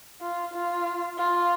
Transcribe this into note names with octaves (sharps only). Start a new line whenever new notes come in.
F4
F4
F4